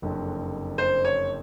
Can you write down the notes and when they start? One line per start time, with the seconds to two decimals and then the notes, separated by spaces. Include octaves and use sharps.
0.02 F#1 F2 D3 F#3
0.78 C5
1.05 C#5